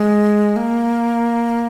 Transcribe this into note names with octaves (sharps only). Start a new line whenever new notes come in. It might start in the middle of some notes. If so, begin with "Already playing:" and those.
Already playing: G#3
A#3